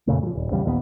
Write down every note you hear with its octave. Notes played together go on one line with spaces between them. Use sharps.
F2 A#2 C#3 A3
F3 F#3
D#1
A#1 E2 C#3 G3
A#1 D#2 F#3 B3